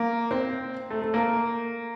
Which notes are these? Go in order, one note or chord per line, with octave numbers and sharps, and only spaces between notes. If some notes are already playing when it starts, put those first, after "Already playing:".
Already playing: A#3
C4
A3
A3
A#3